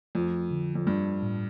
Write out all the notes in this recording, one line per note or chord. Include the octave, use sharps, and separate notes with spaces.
F2 A3
D3
F2
G2 F3
A2